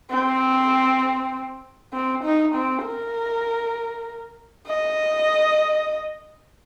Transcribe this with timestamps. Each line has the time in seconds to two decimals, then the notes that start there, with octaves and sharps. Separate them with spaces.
0.11 C4
1.93 C4
2.24 D#4
2.55 C4
2.85 A#4
4.67 D#5